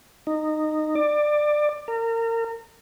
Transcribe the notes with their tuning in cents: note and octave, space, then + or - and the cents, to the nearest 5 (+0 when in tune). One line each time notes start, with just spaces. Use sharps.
D#4 -15
D5 +20
A#4 -30